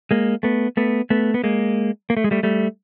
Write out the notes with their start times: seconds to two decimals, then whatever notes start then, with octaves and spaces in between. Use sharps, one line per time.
0.11 G#3 A#3
0.43 A3 B3
0.77 A3 B3
1.10 A3 B3
1.34 B3
1.44 G#3 A#3
2.10 A#3
2.17 A3
2.24 G#3
2.31 G3 A3
2.43 G3 A3